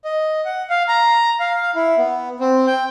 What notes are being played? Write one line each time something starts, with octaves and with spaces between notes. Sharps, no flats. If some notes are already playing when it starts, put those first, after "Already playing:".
D#5
F#5
F5
A#5
F5
E4
B3
C4
G5